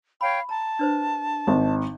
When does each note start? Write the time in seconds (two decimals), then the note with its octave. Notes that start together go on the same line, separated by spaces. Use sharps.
0.21 C#5 F5 G5 B5
0.49 A5 A#5
0.79 D4 B4 C5
1.47 G#1